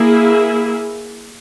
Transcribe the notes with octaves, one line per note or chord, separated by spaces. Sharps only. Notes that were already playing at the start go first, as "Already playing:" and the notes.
Already playing: A#3 E4 G#4